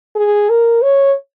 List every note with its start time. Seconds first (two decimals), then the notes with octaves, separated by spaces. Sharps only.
0.16 G#4
0.49 A#4
0.82 C#5